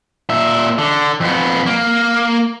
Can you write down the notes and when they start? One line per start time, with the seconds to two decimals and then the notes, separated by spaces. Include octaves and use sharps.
0.29 A#2 E5
0.78 D3
1.20 F2 B3
1.66 A#3